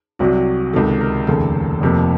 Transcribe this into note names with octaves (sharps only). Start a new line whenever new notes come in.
C2 C3 F#3 F#4
C#2 C3 D#3 A4
A#4
F1 D#2 C#3 A4
F1 F2 C3 F3 A#3